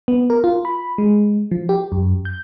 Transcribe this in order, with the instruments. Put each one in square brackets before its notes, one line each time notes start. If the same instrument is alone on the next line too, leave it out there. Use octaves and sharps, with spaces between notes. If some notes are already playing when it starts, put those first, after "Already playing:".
[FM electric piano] B3
A#4
F4
B5
G#3
F3
G4
F#2
G6